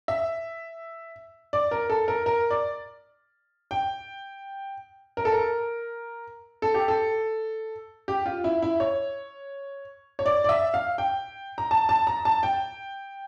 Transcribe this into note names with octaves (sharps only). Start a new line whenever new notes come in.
E5
D5
A#4
A4
A#4
A#4
D5
G5
A#4
A4
A#4
A4
G4
A4
G4
F4
E4
E4
C#5
C#5
D5
D5
E5
F5
G5
A#5
A5
A5
A#5
A5
G5